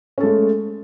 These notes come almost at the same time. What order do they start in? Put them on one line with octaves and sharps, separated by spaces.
C#4 A4 G#3 A3